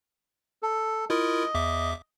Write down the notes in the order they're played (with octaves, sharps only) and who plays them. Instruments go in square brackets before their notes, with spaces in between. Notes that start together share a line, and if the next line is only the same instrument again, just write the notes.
[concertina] A4
[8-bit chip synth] E4 F4 A#4 [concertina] D#5
[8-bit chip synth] E2 E5 D6